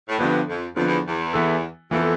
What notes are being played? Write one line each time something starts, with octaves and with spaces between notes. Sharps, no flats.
A2
G2 D3 F3 B3
F2
F2 D3 F3 B3
E2
E2
E3 B3 E4 A4
F2 E3 B3 E4 A4